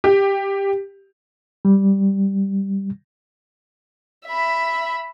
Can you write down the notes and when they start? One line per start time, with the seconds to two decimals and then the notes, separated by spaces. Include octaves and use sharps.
0.04 G4
1.65 G3
4.26 E5 B5